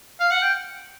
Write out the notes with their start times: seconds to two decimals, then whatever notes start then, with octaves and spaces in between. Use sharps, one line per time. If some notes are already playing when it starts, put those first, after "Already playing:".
0.20 F5
0.31 F#5
0.42 G5